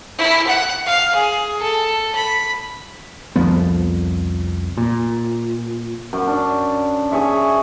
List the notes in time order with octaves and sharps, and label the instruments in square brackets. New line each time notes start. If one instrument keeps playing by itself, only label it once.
[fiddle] E4
F#5
F5
G#4
A4
B5
[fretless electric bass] C2 F2 F3 B3
A#2
[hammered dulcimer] F#2
D4
C#4 G#4 C#5 E5